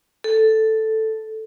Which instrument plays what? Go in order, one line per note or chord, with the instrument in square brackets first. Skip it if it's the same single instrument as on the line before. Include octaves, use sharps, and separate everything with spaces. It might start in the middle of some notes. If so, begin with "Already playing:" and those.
[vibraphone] A4